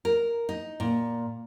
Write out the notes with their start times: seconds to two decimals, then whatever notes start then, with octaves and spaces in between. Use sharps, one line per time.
0.05 A#4
0.49 D#4
0.80 A#2